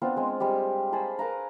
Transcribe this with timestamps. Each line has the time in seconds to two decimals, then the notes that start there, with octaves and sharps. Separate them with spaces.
0.02 B3 C4 D4 F4
0.16 G#3 C4
0.40 G3 G#3 G4
0.92 G#4 C5 A5 B5
1.19 A#4 B4 F5 A#5